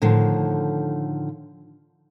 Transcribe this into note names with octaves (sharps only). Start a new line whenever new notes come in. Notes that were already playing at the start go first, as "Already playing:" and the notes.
A2 D3 D#3 F3